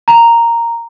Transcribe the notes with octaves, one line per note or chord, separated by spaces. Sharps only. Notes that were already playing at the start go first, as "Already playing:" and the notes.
A#5